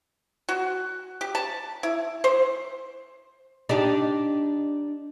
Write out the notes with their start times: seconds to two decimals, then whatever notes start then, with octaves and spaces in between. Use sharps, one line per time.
0.49 F#4
1.21 G4
1.35 A5
1.83 E4
2.24 C5
3.69 D4 D#4 G4